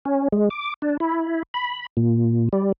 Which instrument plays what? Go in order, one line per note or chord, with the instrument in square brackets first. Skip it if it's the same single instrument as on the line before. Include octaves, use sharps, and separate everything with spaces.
[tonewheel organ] C#4
G#3
D6
D4
E4
B5
A#2
G3